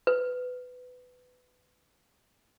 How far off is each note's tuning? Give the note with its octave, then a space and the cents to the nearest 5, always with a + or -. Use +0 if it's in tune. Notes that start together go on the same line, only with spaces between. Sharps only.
B4 +20